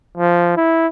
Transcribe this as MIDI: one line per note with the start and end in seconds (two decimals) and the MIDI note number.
0.17 0.53 53
0.57 0.87 64